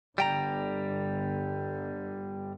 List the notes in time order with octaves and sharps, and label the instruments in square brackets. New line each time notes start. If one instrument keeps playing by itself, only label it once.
[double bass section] G1 D3 [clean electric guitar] G3 G5 A#5